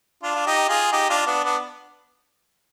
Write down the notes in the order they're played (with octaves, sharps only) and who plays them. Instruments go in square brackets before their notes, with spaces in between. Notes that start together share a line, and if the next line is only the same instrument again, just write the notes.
[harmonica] D4 F4
F4
D#4 G4
F4 G#4
D#4 G4
D4 F4
B3 D4
B3 D4